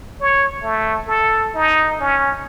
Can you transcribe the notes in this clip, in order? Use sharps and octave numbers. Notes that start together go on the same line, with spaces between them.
C#5
A3
A4
D#4
C#4